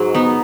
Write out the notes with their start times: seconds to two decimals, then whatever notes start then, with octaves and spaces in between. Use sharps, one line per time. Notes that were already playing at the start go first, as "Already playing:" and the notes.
Already playing: G#2 F#3
0.14 B3 D#4